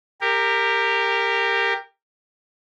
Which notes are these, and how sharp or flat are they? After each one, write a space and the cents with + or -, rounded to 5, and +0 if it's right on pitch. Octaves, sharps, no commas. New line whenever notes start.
G4 +15 A#4 -15